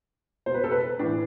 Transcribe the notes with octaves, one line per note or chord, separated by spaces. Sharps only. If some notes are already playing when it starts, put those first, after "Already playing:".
B2 C5
B4
A4
B4
A2 E3 D4